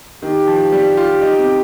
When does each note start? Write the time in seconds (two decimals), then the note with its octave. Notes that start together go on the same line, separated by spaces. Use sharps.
0.23 D#3 G4
0.47 F3
0.72 G3
0.97 F4
1.22 D#4
1.38 C4